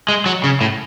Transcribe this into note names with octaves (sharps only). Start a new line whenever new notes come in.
G#3
F#3
C#3
A2